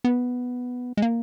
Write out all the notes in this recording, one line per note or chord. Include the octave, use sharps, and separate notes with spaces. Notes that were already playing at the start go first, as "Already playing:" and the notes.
B3
G#3
A#3